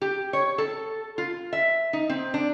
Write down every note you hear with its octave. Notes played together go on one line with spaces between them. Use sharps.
G4
C#5
A4
F4
E5
D#4
C4
D4